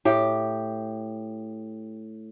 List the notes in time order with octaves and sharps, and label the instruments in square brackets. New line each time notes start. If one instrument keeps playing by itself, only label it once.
[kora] A2 G4 G5